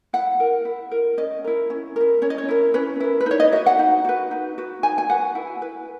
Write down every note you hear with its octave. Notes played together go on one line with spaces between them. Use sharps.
E4 F#5
A#4
E4
A#4
C#4 D#5
E4 A#4
C#4
E4 A#4
C#4 C#5
D#5
C#5
E4 A#4
C#4 B4
E4 A#4
B4
D#4 C#5
D#5
F#4 B4 E5
F#5
D#4
F#4 B4
D#4
F#4 B4
D#4 G#5
G#5
F#4 B4 F#5
E4
B4